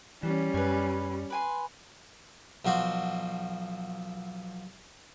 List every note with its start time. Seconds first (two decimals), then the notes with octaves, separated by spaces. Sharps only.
0.23 E3 G3 C#4
0.54 F#2 B4 G#5
1.30 B4 G#5 C6
2.65 B1 F3 F#4 C6